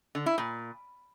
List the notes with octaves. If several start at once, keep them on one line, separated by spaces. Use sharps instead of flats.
D3
E4
A#2